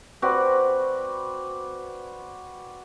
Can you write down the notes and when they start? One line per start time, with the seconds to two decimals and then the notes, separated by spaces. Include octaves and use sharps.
0.22 C4 F#4 B4 D5